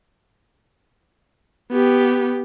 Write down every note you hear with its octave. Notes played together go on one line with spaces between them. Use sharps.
B3 G4